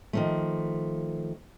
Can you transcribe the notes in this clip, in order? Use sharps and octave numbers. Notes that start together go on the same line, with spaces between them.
D#3 F3 A3